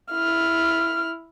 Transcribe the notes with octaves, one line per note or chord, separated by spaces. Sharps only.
E4 F6